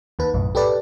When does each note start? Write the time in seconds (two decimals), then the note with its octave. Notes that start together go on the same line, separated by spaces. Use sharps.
0.19 D#2 D#3 B4
0.34 B1 F#2 A2
0.55 G4 A4 B4 D5